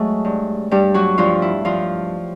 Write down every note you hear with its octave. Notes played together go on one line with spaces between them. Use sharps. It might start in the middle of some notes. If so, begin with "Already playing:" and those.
Already playing: F#3 G#3 A3 G#4
G2
G2 G3 G4
F#3 F#4
G2 F3 F4
E4
G2 F3 F4